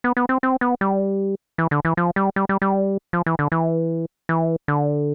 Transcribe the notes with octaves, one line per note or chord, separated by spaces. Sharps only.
B3
B3
C4
C4
B3
G3
E3
D3
E3
F3
G3
G3
G3
G3
F3
E3
D3
E3
E3
D3